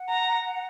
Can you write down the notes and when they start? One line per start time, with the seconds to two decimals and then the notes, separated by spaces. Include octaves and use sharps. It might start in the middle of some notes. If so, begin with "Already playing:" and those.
Already playing: F#5
0.10 A#5